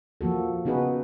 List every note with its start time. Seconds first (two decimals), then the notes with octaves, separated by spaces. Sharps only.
0.21 F3 A#3 F#4 A4
0.65 C#3 B3 D#4 F#4 G#4 B4